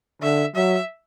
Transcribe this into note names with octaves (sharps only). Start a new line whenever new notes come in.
D3 E5
F#3 E5